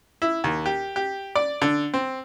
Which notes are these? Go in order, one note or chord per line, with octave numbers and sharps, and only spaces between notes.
E4
D#2
G4
G4
D5
D3
C4